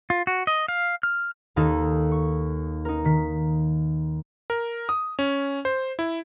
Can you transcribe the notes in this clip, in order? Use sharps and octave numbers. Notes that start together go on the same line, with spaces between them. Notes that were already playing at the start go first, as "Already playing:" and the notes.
F4
F#4
D#5
F5
F6
D#2 D#3 D#4 A4
C#6
D#4 A#4
D#3 B6
A#4
D#6
C#4
C5
E4